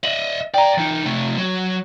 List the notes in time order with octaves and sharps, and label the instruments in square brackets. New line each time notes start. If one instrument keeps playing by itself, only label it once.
[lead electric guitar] D#5 E5 [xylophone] F#7
[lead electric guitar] D5 F5 [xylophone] G5 A#5
[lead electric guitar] E3 D#4
C3 A3
F#3